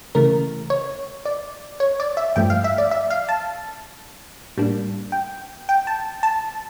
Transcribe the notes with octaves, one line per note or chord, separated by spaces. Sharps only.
C#3 E3 A3 A#4
C#5
D5
C#5
D5
E5
G2 F3 A3 G5
F5
E5
D5
E5
F5
A5
A2 G3 A#3 D4
G5
G5
A5
A5